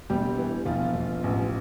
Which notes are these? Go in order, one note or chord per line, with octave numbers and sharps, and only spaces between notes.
E1 G3 G4
E3
E1 F3 F4
E1
A1